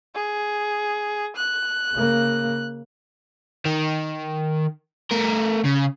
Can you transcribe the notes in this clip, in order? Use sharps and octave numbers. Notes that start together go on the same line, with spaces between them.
G#4
F#6
C#3 A#3
D#3
A3 A#4
C#3